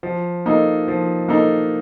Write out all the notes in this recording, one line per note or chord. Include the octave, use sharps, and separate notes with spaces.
F3
A#3 D#4 A4
F3
A#3 D#4 A4